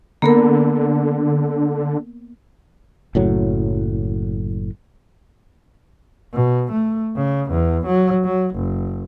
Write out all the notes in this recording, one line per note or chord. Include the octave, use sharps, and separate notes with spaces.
D3 A#3 B3 A#4
F#1 A2 F#3
B2
A3
C#3
E2
F#3
F#3
F#1